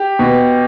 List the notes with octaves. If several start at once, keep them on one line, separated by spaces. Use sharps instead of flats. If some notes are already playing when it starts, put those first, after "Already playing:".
Already playing: G4
B2